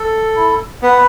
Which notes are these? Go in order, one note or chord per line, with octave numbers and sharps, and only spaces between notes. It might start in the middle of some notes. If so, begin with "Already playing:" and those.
Already playing: A4
E4
B3 B4